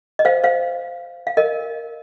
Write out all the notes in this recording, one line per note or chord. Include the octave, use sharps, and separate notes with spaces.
D#5
C5 F5
C5 F5
F5
A#4 D#5